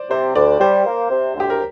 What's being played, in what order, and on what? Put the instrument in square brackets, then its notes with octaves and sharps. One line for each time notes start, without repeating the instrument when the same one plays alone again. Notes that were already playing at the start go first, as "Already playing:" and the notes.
Already playing: [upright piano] C5 D5
[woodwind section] C3 [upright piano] C5
[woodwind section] D2 [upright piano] D5
[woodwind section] G3 [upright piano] C5
[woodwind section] A#3
C3
[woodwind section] D2 [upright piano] G4
[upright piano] A#4